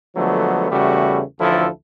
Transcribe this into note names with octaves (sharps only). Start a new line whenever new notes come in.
D3 F3 F#3 G#3 A3 B3
E2 C#3 G3 A3 E4 F#4
A1 D2 F3 E4 A4